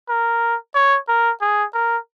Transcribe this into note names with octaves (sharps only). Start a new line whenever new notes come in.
A#4
C#5
A#4
G#4
A#4